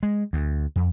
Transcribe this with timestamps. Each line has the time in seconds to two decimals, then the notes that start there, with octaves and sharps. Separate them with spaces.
0.03 G#3
0.33 D2
0.76 F2